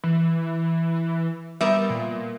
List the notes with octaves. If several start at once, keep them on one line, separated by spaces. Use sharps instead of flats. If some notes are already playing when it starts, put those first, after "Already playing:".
E3
G3 B3 A#4 E5
A#2